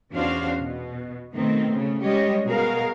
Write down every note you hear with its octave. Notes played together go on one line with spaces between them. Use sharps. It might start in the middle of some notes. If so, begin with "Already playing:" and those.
E2 C#4 D4 F#4 C5 F5
B2
B2 D#3 A3 C4
C#3 A3
G3 G#3 C#4 G4 C#5 D#5
B2 F#4 G#4 A#4 F5